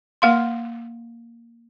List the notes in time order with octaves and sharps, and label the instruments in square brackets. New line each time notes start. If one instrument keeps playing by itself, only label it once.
[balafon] A#3 F5 C6